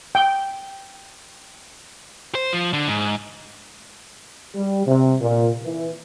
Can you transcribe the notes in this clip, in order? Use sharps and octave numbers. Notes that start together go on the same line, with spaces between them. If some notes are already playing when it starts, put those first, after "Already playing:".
G5
C5
F3
D3
G#2
G3
C3
A#2
E3